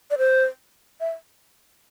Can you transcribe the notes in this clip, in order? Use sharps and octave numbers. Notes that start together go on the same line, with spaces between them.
D5
C5
E5